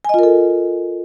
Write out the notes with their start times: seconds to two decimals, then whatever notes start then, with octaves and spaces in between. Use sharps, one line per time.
0.05 G#5
0.09 D#5
0.14 F4
0.19 A#4
0.23 A4